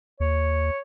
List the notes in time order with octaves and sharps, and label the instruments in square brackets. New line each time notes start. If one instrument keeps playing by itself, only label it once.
[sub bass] D#2 [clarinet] C#5